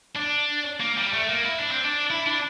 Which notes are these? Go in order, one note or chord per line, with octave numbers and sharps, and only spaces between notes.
D4
A#3
G3
A3
A#3
E4
D4
C4
D4
E4
D4